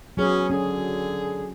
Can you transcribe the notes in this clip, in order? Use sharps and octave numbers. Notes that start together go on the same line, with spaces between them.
F#3 B3 C#4 G#4
D3 C#4 G#4